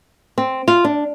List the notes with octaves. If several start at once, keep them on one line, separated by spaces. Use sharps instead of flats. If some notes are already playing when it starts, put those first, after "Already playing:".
C4
F4
D4